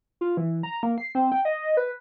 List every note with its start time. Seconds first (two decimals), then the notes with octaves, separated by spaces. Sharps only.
0.21 F4
0.37 E3
0.63 A#5
0.83 A#3
0.98 C7
1.15 C4
1.32 G5
1.45 D#5
1.77 B4